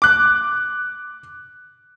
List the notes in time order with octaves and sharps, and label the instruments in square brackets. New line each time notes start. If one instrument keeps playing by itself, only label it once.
[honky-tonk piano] D6 F#6